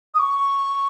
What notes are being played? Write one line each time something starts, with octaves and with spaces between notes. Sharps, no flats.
D#6
C#6